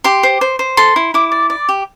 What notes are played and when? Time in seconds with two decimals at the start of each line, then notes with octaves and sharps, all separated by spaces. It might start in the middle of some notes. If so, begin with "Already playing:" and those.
0.04 G4 C6
0.23 C5
0.41 C5
0.59 C5
0.77 A4 C6
0.96 E4
1.14 E4 D6
1.32 D5
1.50 D5
1.69 G4